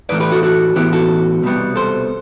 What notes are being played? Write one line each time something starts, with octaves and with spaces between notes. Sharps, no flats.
A2 E3 A3 B4 D5
G4 B4
F#4 A4
F#4 A4
A2 E3 B3 E4 G4
F#4 A4
C2 B2 G3 B3
A4 C5